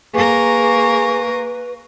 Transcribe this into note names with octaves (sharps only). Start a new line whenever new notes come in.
A#3 G#4 A#4 B4 C#6